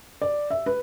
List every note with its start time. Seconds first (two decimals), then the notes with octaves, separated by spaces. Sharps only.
0.22 D5
0.50 E5
0.66 B4